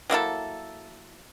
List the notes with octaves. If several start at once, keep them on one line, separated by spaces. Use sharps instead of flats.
F#3 A#3 E4 A4